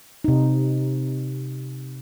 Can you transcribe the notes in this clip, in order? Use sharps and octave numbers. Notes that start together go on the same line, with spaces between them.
C3 D#4